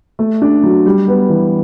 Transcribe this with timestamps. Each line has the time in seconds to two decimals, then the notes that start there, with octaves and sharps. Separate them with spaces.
0.19 A3
0.42 D4
0.63 F#3
0.86 G3
1.08 B3
1.29 E3